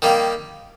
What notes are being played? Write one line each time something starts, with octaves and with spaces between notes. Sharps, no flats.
D#3 G3 A#3